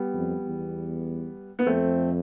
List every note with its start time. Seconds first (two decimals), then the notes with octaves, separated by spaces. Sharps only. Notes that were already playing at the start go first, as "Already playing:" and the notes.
Already playing: G3 B3
0.14 F2
0.45 E2
1.59 B3
1.66 F2 A3 C4